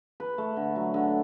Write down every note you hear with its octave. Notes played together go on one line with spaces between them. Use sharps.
B4
A3
D3
F#3
D3